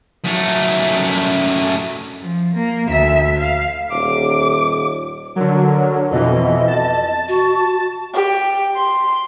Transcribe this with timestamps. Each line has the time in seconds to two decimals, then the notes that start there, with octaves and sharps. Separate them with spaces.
0.24 F#2 A3
2.22 F3
2.55 A#3
2.88 D2 E5
3.38 F5
3.91 D#1 D6
5.36 D3 F#3 A#4
6.11 F2 B2 E3 D#5
6.67 A5
7.29 F#4
8.13 G4
8.76 C6